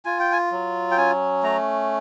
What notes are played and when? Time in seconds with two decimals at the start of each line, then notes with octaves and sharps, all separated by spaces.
0.05 F4 G#5
0.19 G5
0.32 G#5
0.51 F#3
0.91 G5
0.97 C#4 G#5
1.43 A3 A#5